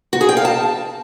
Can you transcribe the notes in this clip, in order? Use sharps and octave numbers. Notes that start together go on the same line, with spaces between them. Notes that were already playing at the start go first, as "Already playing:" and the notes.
F#4
G#4
G5
F5
A5